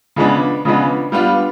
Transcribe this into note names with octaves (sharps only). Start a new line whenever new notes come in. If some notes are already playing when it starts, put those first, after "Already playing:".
C#3 F3 G#3 B3 D4
C#3 F3 G#3 B3 D4
G3 B3 D4 F4